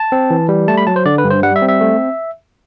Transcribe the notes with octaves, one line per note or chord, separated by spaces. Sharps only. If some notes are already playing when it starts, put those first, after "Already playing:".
Already playing: A5
C4
E3
G3
A3 A5
B5
F#3 A5
C5
D3 D5
B4
G2
C5
G3 F#5
E5
C4
E5
A3